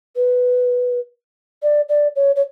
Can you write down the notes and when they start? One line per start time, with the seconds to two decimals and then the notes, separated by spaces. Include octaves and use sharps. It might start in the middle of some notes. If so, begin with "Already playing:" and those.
0.16 B4
1.63 D5
1.89 D5
2.16 C#5
2.36 C#5